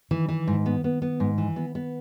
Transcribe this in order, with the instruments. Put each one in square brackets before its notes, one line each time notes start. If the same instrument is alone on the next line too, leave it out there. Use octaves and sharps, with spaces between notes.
[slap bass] D#3 [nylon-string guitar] E3
[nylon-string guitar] E3
G#2
B3
B3
B3
G#2
E3
B3
B3